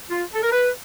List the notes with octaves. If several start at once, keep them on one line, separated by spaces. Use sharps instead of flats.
F4
A4
A#4
B4